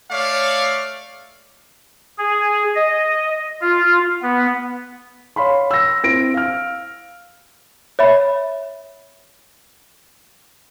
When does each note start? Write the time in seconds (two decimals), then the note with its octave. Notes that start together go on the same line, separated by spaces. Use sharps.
0.10 A3 C#5 D5 F5
2.18 G#4
2.75 D#5
3.61 F4
4.22 B3
5.36 C#5 F5 B5 C6
5.71 E6 A#6
6.03 C4 E4 A#6 D7
6.34 F5 F6
7.99 C#5 E5 B5